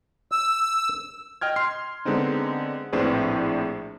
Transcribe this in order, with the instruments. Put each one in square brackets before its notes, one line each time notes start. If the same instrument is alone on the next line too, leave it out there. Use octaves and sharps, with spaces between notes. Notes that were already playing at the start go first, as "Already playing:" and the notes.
[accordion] E6
[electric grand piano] D#5 G5 F6 G#6
C6 F6 C7
D3 G#3 B3 C4 D#4
A#1 A2 C4 D4 G#4 B4